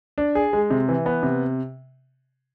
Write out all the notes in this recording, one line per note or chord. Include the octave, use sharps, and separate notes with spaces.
D4
G#4
G#3
C3
E3
B3
C3